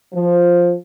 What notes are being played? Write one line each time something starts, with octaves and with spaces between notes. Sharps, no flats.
F3